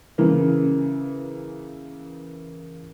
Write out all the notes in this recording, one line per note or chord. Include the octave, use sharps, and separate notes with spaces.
C#3 E3 A#3